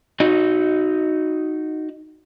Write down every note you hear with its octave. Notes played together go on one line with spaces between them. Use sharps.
D#4 F#4 D#5